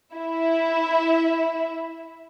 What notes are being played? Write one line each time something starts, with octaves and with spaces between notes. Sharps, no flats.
E4 E5